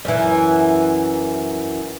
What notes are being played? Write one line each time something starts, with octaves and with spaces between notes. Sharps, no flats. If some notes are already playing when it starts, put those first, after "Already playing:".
F#2 E3